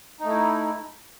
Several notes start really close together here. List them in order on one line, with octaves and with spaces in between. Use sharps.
D#4 A3 E4